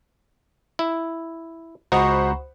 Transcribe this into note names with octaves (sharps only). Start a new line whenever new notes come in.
E4
C#2 F#4 C5 D#5 F#5 A#5 B5 C#6